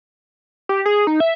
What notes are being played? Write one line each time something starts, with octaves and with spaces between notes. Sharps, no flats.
G4
G#4
D#4
E5